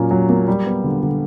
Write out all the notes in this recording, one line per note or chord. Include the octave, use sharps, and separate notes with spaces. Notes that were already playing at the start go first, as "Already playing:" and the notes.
Already playing: A#2 F#3 A#3 C#4
F#3
A#3
G3
B3
D3
D3